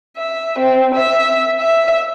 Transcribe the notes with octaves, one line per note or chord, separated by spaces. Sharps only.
E5
C4
E5
E5